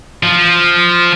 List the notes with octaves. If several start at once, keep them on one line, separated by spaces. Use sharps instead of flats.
F3